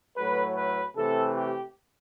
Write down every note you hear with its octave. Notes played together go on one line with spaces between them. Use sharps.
A2 F#3 A3 B4
B4
C3 E3 A3 C4 A4
G4